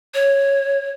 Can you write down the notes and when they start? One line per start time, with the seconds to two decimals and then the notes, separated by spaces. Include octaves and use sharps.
0.14 C#5